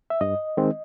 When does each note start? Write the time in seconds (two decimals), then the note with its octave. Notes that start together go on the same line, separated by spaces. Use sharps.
0.10 E5
0.21 G2 D#5
0.57 D#3 G#3 C4